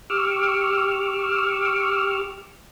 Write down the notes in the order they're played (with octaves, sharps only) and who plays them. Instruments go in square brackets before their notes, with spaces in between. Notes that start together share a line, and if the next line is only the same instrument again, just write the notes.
[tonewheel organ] G4 C#6 D6 E6 F6